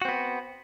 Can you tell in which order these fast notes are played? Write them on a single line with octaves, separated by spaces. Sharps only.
F#4 C4 B3